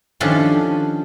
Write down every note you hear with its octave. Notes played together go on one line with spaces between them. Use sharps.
D#3 F3 C#4 D4 G4 A4